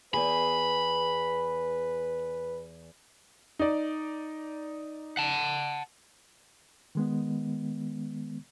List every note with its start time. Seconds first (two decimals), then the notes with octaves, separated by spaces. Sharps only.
0.14 E2 G#4 B4 B5
3.59 D#4 D5
5.17 F#5 A5
6.95 D#3 G#3 B3